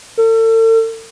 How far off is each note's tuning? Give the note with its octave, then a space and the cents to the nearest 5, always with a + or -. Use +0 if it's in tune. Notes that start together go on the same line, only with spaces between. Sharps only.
A4 +40